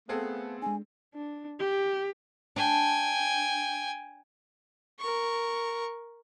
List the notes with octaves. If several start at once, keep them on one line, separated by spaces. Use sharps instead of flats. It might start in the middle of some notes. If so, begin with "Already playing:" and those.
A3 B3 C4 G#4 A4 B4 F5 G#5
G#3 D4 G#5
D4
G4
D4 G5 G#5
A#4 C#6